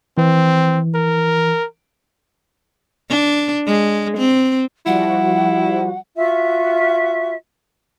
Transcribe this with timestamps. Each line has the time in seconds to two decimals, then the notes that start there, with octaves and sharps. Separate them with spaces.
0.18 E3 C4
0.95 A#4
3.10 D4
3.67 G#3
4.18 C4
4.86 F3 G3 E4 F#4 F#5
6.15 F4 F#4 E5